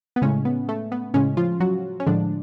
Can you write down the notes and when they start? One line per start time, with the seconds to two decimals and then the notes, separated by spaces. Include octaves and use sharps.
0.16 B3
0.22 A2 C#3 G#3 C#4
0.45 B3
0.69 A3
0.92 B3
1.14 A2 C#3 G#3 C#4
1.37 F3 F4
1.60 F#3 F#4
2.00 C#4
2.06 A2 D3 F3 G#3 D4